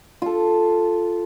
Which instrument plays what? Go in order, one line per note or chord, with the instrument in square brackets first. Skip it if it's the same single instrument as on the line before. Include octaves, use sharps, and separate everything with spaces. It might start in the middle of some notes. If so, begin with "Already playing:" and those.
[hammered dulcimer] F4 A4